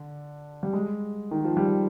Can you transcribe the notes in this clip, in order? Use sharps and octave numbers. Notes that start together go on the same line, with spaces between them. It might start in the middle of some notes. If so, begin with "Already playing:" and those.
Already playing: D3
G3
G#3
D#3
F3
G3